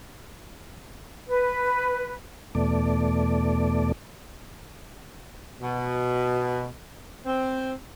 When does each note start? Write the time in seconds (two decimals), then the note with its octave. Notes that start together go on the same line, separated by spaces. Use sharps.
1.27 B4
2.55 E2 B2 A3 D5
5.61 B2
7.25 C4